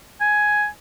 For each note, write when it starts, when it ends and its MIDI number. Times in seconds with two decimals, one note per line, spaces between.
0.21 0.66 80